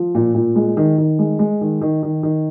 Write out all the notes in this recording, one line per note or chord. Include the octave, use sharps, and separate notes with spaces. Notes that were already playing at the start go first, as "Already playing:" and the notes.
Already playing: F3
A#2
A#2
G#3
D#3
D#3
G#3
G#3
D#3
D#3
D#3
D#3